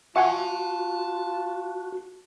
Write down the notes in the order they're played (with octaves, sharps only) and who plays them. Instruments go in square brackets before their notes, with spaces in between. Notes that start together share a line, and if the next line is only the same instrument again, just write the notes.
[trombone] F4 [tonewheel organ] F#4 [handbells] E5 F#5 G#5 [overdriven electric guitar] A5 C6